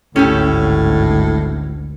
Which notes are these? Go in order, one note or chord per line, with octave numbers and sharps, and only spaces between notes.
G#1 D2 A2 C#4 G4 A4